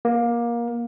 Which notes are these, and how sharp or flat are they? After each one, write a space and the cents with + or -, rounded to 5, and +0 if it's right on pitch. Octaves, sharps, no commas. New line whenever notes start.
A#3 +20